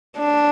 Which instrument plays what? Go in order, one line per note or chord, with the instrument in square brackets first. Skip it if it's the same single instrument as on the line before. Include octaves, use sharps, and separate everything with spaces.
[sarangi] D4